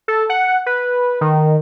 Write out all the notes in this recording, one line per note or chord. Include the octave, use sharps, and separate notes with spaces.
A4
F#5
B4
D#3